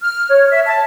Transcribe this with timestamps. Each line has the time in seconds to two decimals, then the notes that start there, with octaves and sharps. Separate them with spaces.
0.01 F6
0.29 C#5
0.50 E5
0.66 A5